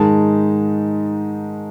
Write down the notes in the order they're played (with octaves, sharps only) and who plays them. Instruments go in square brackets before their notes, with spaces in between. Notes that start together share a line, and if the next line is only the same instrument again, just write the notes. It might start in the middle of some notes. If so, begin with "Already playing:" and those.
Already playing: [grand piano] G#2 D#3 G#3 D#4 A5